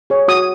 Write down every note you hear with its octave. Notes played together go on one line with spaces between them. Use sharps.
G#4 C#5
F#4 D#6